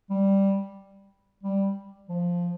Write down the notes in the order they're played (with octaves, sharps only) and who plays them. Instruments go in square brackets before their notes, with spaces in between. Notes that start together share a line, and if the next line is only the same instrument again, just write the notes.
[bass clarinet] G3
G3
F3